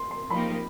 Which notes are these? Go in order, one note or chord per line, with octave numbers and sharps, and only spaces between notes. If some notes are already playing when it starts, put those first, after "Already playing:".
Already playing: C6
C6
F3 A#3 D#4 G4 B5